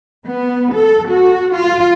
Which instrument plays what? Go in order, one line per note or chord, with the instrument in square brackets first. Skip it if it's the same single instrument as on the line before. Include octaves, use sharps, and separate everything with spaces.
[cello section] B3
A4
F#4
F4